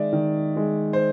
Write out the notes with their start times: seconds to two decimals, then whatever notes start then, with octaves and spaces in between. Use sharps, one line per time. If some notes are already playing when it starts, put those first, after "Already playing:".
Already playing: D#3 G#3 D5 E5
0.13 D#3
0.56 G#3
0.93 C5